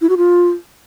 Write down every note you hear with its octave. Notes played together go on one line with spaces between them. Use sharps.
E4
F#4
F4